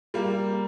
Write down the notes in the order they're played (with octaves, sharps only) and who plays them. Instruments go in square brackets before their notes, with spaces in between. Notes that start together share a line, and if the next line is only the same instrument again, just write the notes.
[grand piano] G3 A#3